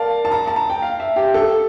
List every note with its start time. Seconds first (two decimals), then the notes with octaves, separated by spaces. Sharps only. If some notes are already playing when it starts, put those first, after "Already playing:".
Already playing: A#4 D5 F5 A5
0.25 A5
0.32 A#5
0.47 A5
0.56 A#5
0.70 G5
0.82 F5
1.00 E5
1.16 G4
1.34 A4